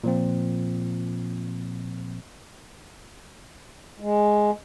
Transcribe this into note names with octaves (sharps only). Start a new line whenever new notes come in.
A#2 F3 C4
G#3